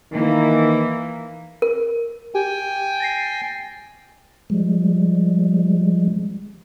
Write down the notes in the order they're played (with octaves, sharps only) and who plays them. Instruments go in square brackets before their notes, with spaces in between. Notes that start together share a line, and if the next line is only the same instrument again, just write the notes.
[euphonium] D#3 [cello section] E3 A#3
[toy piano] A#4
[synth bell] G4 [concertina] G5 G#5
[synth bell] A6 A#6 C7
[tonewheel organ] F3 G3 G#3